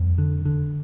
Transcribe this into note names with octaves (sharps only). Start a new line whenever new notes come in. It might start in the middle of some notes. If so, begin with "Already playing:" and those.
Already playing: F2 G3
D3
D3